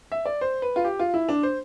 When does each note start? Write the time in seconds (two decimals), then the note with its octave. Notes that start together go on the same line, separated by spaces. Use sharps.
0.12 E5
0.26 D5
0.41 C5
0.62 B4
0.76 F4
0.84 G4
0.99 F4
1.14 E4
1.29 D4
1.43 C5